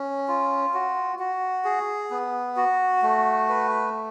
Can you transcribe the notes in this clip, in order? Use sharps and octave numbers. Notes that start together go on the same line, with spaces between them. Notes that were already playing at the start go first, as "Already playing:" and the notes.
Already playing: C#4
F4
F#4
F#4
G#4
B3
F#4
A3
B4